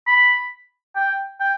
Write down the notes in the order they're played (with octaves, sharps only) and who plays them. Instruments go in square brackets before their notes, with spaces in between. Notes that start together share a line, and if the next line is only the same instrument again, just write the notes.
[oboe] B5
G5
G5